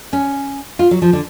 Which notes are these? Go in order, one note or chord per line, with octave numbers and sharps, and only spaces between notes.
C#4
F4
F#3
F3
D3